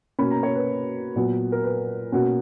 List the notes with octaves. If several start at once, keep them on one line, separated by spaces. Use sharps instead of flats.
B2 A#3 C#4 B5
A#5
C#5
B4
A#2 F#3 B3
A#4
B4
B2 A#3 C#4 F#4